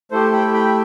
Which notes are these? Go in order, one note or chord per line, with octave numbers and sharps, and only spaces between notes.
A3 E4 G4 A4 C5
G5 B5
G5 B5